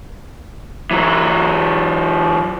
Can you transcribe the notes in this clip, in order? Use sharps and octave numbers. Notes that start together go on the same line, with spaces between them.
E3 F#3